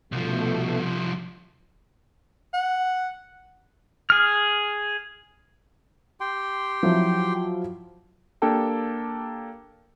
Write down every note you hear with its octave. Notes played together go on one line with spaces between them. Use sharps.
C2 B2 F3 A3
F#5
G#4 F6
G4 G5 C6
F3 F#3 E4
A#3 D4 G4 A4 G5 A5